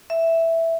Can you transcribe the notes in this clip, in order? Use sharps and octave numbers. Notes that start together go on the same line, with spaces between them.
E5